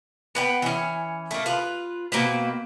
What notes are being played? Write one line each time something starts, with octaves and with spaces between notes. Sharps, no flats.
B3 B4 G5
E3 C#4
A3 A#3
F4 B4
B2 A#3 C4 B4